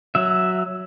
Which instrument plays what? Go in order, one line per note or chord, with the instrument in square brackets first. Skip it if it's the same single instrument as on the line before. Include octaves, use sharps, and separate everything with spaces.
[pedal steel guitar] F#3 E5